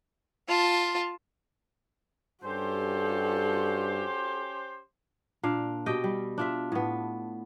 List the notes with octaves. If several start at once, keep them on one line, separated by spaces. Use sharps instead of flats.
F4 A5
G2 C#4 F#4 G4 A4 C5
A#2 D4 F5
B2 G4 D#5 G5
G3
D4 F4 E5
A2 B3